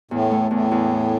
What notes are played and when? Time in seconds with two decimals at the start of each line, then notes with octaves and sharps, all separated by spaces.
0.11 E2 A2
0.31 A3
0.51 E2 A2
0.71 E2
0.91 A3